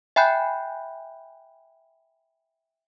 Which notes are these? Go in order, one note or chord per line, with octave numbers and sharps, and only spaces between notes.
E5 G5 G#5 B5 F#6 G6